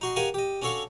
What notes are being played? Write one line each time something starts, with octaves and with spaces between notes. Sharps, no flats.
D#4 F#4 C6
G4 A#4 D#5 F5 F#5 G#5
G4 D#5
C#4 D4 F#4 A4 C#5 F5